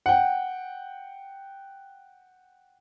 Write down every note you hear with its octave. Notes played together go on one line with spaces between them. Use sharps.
F#5 G5